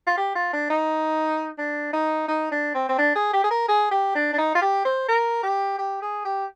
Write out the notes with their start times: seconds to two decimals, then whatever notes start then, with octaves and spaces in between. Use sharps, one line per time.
0.07 F4
0.17 G4
0.35 F4
0.53 D4
0.70 D#4
1.58 D4
1.93 D#4
2.28 D#4
2.51 D4
2.74 C4
2.89 C4
2.98 D4
3.15 G#4
3.33 G4
3.44 G#4
3.51 A#4
3.68 G#4
3.91 G4
4.15 D4
4.33 D4
4.38 D#4
4.55 F4
4.62 G4
4.85 C5
5.08 A#4
5.43 G4
5.78 G4
6.02 G#4
6.25 G4